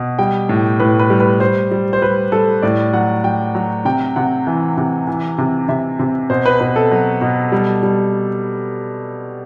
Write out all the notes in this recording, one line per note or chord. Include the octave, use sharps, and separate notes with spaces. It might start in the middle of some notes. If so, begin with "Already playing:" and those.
Already playing: B2
G3 G5
A2
A2 B4
B4
G3
B4
G3 C5
G3
C5
G3 B4
G3 A4
A2 D5
F#3 F#5
F#3 G5
F#3
C3 G5
C3 F#5
E3
C3
E3
C3
C3 E5
C3
B2 C5
B4
B2 B4
A4
F#3
B2
G3
G3